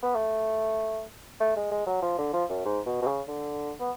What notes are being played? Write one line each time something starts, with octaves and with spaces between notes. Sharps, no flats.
B3
A3
A3
G#3
G#3
F#3
F3
D3
F3
F#2
G#2
B2
B2
C#3
D3
B3